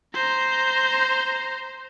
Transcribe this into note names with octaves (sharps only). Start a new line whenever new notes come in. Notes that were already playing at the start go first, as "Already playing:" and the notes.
C5 A#5